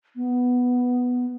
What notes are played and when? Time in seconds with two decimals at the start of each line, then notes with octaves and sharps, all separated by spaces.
0.16 B3